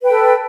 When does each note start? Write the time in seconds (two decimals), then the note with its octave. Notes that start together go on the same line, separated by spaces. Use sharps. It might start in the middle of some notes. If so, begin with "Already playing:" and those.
0.01 B4
0.05 G5
0.09 A4